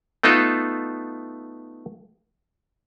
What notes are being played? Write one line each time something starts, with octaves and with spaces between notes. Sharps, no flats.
A3 B3 D#4 F4 A4